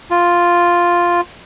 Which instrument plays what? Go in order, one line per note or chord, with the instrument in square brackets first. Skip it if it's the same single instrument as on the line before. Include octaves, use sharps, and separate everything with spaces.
[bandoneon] F4